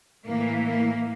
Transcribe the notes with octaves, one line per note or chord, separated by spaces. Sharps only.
A2 E3 A#3
A#3